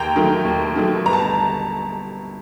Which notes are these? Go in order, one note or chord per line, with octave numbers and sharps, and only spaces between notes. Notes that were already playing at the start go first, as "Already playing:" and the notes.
Already playing: D#2 G5 A#5
D#3 F#3 A3
D#2
D#3 F#3 A3
G1 A#5
A5